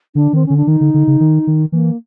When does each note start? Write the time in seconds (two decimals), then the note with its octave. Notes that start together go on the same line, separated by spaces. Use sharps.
0.15 D3 D4
0.33 D#3 C4
0.46 D3 C#4
0.57 D4
0.67 D#3 D#4
0.81 D3
0.94 D3
1.07 C#3
1.20 D#3
1.47 D#3
1.72 E3 A#3